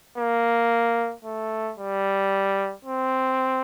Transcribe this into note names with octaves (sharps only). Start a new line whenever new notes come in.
A#3
A3
G3
C4